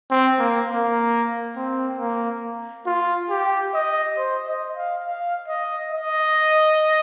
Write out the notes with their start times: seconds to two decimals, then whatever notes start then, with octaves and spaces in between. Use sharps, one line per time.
0.10 C4
0.39 A#3
0.69 A#3
1.57 C4
1.99 A#3
2.87 F4
3.30 G4
3.74 D#5
4.18 C5
4.47 D#5
4.76 F5
5.05 F5
5.48 D#5
5.92 D#5